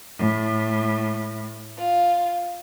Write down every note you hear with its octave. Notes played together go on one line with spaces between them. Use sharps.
A2
F4